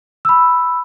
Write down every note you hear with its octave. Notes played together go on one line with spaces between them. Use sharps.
B5 E6